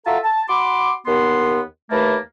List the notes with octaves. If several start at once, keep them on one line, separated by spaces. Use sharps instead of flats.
F4 F#4 A4 E5 A5 A#5
A5
F#4 B5 C6 D6
D#2 B3 C6
D#2 E3 A3 A#3 A5 B5